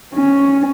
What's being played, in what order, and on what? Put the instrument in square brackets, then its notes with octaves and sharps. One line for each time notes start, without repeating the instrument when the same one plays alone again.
[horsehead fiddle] C#4